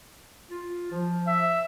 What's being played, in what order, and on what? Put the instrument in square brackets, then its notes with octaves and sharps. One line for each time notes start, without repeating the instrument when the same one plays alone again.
[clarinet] F4
F3
[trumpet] E5